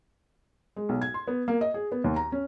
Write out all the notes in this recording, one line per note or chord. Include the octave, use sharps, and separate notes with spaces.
G#3
B1
G#6
C6
B3
A#3
D#5
G#4
B3
D#2
A#5
C#4